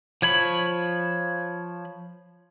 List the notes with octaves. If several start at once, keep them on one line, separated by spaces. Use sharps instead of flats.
F3 C#5 B5